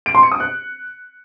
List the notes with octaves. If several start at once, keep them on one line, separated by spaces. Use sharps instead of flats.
D7
C6
C#7
D#6
F#6